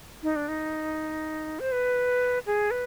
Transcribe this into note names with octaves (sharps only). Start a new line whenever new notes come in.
D#4
D4
D#4
C5
B4
G#4
B4